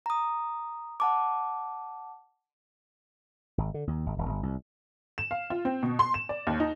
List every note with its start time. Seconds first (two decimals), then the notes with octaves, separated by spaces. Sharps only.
0.06 A#5 D#6
1.00 F#5 A5 D6
3.58 G#1
3.74 D3
3.87 D#2
4.06 G#1
4.18 D#1
4.29 G1
4.43 C2
5.18 E7
5.31 F5
5.50 F4
5.65 C4
5.83 B2
5.99 C6
6.14 E7
6.29 D5
6.47 D#2
6.60 D#4